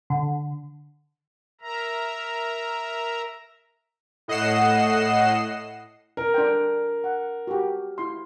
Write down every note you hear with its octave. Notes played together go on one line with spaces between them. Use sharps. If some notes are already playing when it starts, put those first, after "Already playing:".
D3
A#4 E5 A#5
A2 D#5 F#5 C7 E7
A#4
D4 C5 G5
F#5
F#4 G4
E4 C6